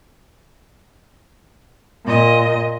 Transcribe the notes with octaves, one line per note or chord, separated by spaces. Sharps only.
A#2 D#5